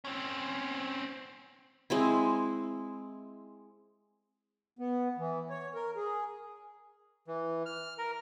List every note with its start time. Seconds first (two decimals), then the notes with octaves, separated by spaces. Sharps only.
0.05 C4 C#4
1.90 G#3 C4 E4
4.79 B3
5.18 E3
5.50 C#5
5.75 A#4
5.96 G#4
7.27 E3
7.66 F6
7.98 A#4